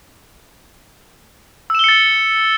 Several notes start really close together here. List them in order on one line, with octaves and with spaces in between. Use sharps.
E6 E7 G7 C#7 A6